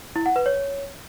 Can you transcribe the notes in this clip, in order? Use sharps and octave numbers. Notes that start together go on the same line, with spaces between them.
E4
F#5
B4
C#5